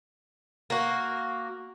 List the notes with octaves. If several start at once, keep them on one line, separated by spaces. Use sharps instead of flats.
A#3 F#4